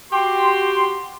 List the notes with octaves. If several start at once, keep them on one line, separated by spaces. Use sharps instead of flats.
F#4 G4 C6